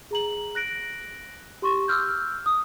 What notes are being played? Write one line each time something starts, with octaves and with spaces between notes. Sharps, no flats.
G#4 A#5 F#7
F#6 A#6 D7 F#7
G4 C6 C#6
D6 E6 F6 G6
D#6